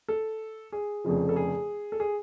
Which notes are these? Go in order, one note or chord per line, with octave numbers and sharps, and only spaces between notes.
A4
G#4
F1 F2 C#3 F3
A4
G#4
A4
G#4